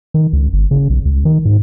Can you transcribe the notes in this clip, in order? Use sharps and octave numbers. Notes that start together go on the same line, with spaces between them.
D#3
C#2
G1
C#3
B1
C#2
D#3
G#2